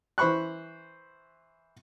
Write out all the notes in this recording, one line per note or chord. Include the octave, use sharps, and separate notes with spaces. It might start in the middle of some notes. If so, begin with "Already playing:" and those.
E3 C5 B5 C#6 F#6